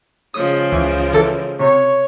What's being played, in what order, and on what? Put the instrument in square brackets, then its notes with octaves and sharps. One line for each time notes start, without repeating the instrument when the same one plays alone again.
[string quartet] C#3 F3 G#3 [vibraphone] G#4 C#5 [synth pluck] D#6
[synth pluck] C#2 E3
E3 A4
[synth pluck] C3 [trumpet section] C#5